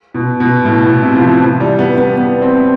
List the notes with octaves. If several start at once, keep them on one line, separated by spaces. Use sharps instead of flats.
B2
B2
A2
B2
C3
F3
E3
F3
G3
B3
B3
B3
C4